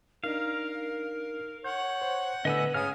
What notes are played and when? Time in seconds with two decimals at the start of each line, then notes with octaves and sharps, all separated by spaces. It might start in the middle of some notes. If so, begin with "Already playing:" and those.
0.24 D4 D#4 A#4 F5
1.64 C#5 F#5 G6
2.02 C5 G6
2.45 A2 D3 B3 D#5 G#5 E6
2.74 G#2 C#3 G#5 D#6 F6